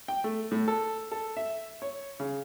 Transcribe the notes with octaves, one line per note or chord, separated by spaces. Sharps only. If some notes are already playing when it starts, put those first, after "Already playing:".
G5
A3
A2
A4
A4
E5
C#5
C#3